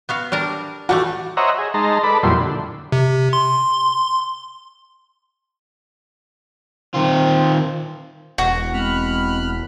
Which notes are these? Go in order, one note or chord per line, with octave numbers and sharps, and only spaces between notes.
B3 F#4 F5
G3 D4 A#4
E3 G3 A3 F#4
C5 C#5 D#5 E5 F#5 A#5
G#4
G#3 D#4 A5 A#5 C6
A4 B4 D5 B5
F2 A#2 F#3 G3 E4 C6
D3
C3
C6
D#3 C4 F4
E1 F#4
G#3 C4 B5 F6 F#6